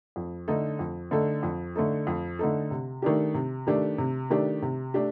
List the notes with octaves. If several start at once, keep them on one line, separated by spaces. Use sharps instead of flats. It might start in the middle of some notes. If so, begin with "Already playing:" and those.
F2
D3 A3 D#4 A4
F2
D3 A3 D#4 A4
F2
D3 A3 D#4 A4
F2
D3 A3 D#4 A4
C3
D#3 A3 D4 G4
C3
D#3 A3 D4 G4
C3
D#3 A3 D4 G4
C3
A3 D4 G4